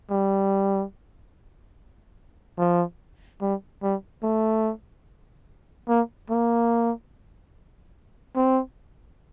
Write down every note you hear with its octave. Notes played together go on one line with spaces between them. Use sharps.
G3
F3
G3
G3
A3
A#3
A#3
C4